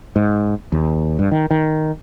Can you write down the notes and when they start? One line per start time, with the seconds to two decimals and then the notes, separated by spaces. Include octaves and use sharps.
0.16 G#2
0.72 D#2
1.19 G2
1.32 D#3
1.51 D#3